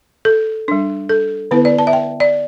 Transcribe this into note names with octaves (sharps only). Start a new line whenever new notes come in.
A4
G3 D4
A4
D3 B3 E4 B4
D5
A5
E5
G5
D5